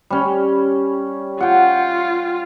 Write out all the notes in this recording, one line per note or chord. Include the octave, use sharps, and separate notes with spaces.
G3 C#4
F4 F#5 G5